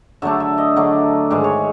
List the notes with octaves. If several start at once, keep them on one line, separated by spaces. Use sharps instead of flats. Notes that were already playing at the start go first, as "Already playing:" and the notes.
D3 F#3 A3 D4 E5
E5
D#5
D3 F#3 A3 D4
G#2 D#3 G#3 D5
C#5